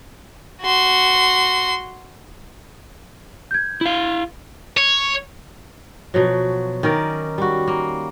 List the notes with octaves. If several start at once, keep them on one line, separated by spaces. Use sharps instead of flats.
F#4 C6
G6 G#6
E4 F5
C#5
B2 F3 F#3
D#3 C#4 A#4 D5
G3 F#4
A#3